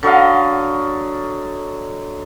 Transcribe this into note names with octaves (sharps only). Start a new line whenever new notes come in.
D3 F#3 D#5 F5